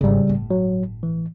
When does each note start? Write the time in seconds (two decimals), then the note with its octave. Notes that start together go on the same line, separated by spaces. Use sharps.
0.01 G#1 C#3 G3 A3
0.27 G1 A2
0.50 F#3
1.03 E3